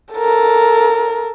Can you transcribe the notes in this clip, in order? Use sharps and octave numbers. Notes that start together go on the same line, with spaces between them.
A4 A#4